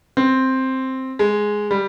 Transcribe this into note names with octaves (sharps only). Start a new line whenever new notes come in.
C4
G#3
G3